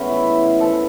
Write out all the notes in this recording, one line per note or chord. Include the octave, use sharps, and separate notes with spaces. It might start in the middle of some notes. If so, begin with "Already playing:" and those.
Already playing: A2 E3 G#3 B3 C#4 B4
E4
G#2 E3 G#3 A4